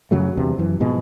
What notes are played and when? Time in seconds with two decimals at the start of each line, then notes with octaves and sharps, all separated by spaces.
0.11 F#2 C#3 F#3 A3
0.37 E2 G2 C3
0.58 F#2 E3
0.80 G#2 B2 F3 G#3